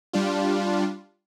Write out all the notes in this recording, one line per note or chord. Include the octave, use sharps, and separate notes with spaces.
G3 D4 F4